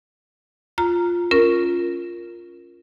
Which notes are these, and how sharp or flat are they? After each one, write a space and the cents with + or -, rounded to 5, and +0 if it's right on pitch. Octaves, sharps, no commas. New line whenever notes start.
F4 +0 A#5 +0
C#4 +10 F4 +0 A#4 +0